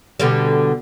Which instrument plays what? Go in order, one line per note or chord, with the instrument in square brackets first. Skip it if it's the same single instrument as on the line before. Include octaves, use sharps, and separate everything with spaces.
[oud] B2 D3 G3